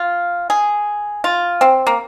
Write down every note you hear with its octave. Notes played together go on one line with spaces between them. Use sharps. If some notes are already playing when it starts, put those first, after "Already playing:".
Already playing: F4
G#4
F4
C4
A#3